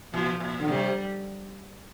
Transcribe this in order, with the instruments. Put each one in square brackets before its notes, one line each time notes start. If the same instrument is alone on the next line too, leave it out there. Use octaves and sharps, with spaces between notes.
[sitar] A#2 [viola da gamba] F3
[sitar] A#2
D3
[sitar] C3 [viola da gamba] G3